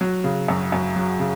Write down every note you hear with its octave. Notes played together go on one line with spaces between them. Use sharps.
F#3
C#3
F#2
F#2
F#3
C#3